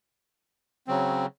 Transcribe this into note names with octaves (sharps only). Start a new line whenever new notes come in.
C#3 F#3 C4